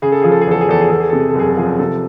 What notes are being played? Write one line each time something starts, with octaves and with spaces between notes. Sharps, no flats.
C#3 G#4
A4
F3 G#4
A4
G#4
E2 A4
G#4
E2 A4
G#4
E2 A4
G#4
C3 A4
G#4
A4
F#1 G#4
A4
F3 G#4
C3 A4